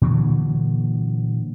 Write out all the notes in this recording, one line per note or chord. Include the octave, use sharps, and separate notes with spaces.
A#2 D3 E3 F#3